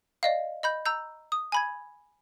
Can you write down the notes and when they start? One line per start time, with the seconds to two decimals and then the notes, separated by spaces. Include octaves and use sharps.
0.23 D5 D#5 F5
0.63 D#5 B5 G6
0.86 A#5 E6 G6
1.32 D#6
1.52 G#5 B5 G#6